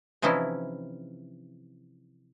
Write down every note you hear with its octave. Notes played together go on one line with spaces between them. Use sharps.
C3 E3 F3 C#4 D#4 E4